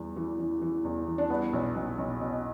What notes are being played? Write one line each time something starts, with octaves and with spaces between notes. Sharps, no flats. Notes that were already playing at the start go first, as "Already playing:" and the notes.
Already playing: E2 E3 G3
E3
E3
E3
E2
E3
D4
G3 B3
B1
B1
B1
B2